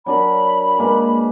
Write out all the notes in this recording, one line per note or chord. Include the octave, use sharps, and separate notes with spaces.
F#3 D4 A#4 B5
G#3 A#3 B4